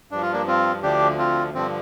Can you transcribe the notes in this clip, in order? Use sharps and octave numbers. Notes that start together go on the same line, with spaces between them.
G2 F3 D4
F4
A#3 D4
C4 F4
D2 D3 F3 D4 G4
C4 F4
G2 D3 F3 C4